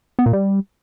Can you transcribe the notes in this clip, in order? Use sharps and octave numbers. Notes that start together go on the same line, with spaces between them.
B3
A#2
G3